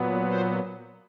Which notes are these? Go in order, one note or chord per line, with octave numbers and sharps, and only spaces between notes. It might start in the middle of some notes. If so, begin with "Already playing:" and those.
Already playing: A#2 F#3 B3
C5